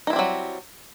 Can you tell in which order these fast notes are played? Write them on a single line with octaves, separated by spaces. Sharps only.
D#4 E4 C4 G3 F#3